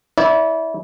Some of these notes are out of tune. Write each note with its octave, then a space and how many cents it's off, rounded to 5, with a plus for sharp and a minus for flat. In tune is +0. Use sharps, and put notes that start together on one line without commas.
E4 -25 D5 -35